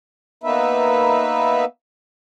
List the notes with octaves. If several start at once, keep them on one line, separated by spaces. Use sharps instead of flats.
A#3 B3 D#4 B4 E5